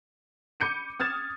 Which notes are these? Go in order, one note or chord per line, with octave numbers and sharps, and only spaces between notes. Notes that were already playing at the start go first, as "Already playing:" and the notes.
B5 D6 G6 C#7 D#7
D#6 F6 G#6 A6 E7